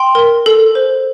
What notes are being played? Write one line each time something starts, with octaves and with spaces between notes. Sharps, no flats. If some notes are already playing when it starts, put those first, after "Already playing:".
Already playing: G5 C6
A#4
A4
C5